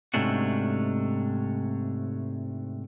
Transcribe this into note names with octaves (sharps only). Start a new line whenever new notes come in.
G#2 C3 A3 C#4 D4 F#4